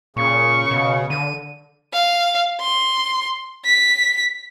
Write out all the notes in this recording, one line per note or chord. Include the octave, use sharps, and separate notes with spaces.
A#2 C#3 C#6
B2
D3 D#7
F5
C6
B6